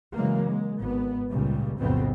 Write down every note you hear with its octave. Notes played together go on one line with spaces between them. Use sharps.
C#3 E3 F#3 G#3 A#3
G#3
G#1 B3
C#2 A#2 C#3 G3
B1 F2 A2 C#3 B3 C4